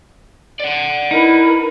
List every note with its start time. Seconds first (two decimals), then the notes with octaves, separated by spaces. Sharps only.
0.60 D5 F#5
1.11 D#4 E4 A#4 B4